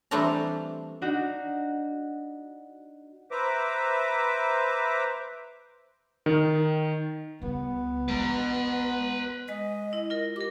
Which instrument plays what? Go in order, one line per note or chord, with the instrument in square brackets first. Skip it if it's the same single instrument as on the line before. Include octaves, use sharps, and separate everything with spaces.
[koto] E3 G3 A3 C4 D4 A#5
[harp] D4 D#4 F#4
[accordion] B4 C5 E5 A#5 D6
[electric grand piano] D#3
[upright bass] C#2 G3 [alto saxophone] B3
[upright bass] G#3 [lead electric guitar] B4 A#5
[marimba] G#3 [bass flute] D#5
[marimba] E4
F4 A#4
[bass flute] G4 [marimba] A#4 D6